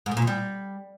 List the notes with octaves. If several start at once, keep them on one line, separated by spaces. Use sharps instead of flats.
G#2
A2
A#2
E2
G3